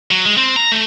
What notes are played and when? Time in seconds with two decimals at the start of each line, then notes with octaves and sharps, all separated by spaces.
0.11 F#3
0.26 G#3
0.37 C4
0.56 A#5
0.72 A3